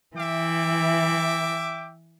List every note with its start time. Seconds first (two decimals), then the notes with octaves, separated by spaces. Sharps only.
0.16 E3 E5 G5 D6